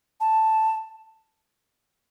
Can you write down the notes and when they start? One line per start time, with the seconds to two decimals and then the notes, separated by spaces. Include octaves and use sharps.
0.20 A5